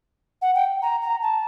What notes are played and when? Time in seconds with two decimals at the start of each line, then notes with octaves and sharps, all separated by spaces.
0.42 F#5
0.55 G5
0.82 A#5
1.02 A#5
1.22 A5